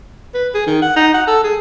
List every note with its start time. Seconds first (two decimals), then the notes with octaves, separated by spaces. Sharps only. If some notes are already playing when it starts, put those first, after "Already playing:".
0.34 B4
0.55 G#4
0.67 D#3
0.82 F#5
0.96 D#4
1.14 F#5
1.27 A4
1.44 G#4